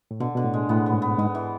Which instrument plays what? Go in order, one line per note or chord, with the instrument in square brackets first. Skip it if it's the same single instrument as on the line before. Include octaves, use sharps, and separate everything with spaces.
[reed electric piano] A2
[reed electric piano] B2 [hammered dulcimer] D3
[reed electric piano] B2 [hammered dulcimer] D3
[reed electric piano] A2
[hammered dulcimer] G#3
[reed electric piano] A2 [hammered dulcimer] B3
[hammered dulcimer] B3
[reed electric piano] G#2
[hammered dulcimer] B3
[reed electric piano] G#2 [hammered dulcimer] B3
[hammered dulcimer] E3